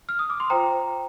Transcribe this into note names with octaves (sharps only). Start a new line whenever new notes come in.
F6
D#6
D6
C6
F4 C5 G5 A#5